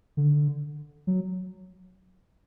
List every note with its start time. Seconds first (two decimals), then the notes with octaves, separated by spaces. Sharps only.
0.17 D3
1.07 F#3